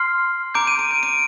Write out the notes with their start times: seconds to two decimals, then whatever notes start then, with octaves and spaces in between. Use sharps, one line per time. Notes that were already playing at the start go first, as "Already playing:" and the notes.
Already playing: C6 F6 C7
0.54 A#5 D6 G6 D7
0.67 D#7
0.79 D7
0.91 D#7
1.03 D7